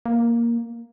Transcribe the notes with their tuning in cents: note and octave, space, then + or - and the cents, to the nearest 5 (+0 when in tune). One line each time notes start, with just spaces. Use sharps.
A#3 +5